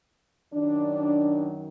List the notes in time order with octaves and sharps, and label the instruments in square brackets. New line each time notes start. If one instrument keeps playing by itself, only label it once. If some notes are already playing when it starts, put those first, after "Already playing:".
[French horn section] F#2 D#3 F#3 D4